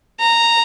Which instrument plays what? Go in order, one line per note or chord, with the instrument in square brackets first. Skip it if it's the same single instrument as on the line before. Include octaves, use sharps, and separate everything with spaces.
[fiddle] A#5